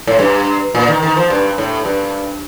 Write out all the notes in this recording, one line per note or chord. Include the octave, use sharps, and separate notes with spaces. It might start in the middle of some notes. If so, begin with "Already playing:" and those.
A2
G2
A#2
D#3
D#3
F3
G2
A2
G2